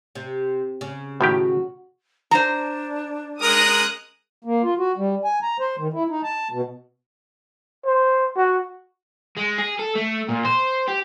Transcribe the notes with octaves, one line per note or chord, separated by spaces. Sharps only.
C3
C#3
A2 D#3 F#4 G4
D4 C5 A#5
G#3 A#4 D#6 F#6
A#3
F4
F#4
G3
G#5
A#5
C5
D#3
E4
D#4
A5
B2
C5
F#4
G#3
G#4
A4
A3
A#2
C5
G4